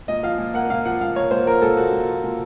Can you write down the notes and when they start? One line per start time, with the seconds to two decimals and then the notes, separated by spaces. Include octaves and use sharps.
0.08 A#2 D#5
0.23 F3 F5
0.38 A#2
0.54 A#3 F#5
0.70 A#2 F5
0.85 F3 F#5
1.01 A#2 F5
1.15 A#3 C#5
1.31 A#2 C5
1.46 F3 A#4
1.62 A#2 A4
1.77 A#3 F#4
1.92 A#2
2.09 F3
2.24 A#2